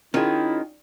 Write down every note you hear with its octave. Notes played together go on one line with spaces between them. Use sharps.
D#3 C#4 E4 F4 G#4